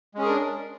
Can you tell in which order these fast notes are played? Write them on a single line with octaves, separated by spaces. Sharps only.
G#3 C#4 G#4 A#4 D4